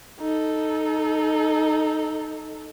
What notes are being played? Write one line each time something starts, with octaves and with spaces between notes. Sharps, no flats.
D#4 A4